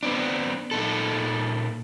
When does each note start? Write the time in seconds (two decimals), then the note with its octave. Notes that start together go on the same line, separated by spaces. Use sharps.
0.03 B3 C4 D4
0.71 A#2 D#4 A4